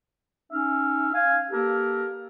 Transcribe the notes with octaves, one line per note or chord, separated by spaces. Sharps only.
C#4 D#4 E5 F6
F5 G#5
A#3 G4 A4 A#4